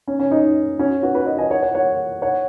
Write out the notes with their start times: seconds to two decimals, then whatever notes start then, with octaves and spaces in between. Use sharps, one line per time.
0.07 C#4
0.19 C#4
0.31 D#4
0.79 C#4 F#4
1.03 F#4 B4
1.15 F#4 B4
1.26 B4 D#5
1.38 D#5 G#5
1.50 C#5 F#5
1.63 C#5 F#5
1.74 C#5 F#5
2.22 C#5 F#5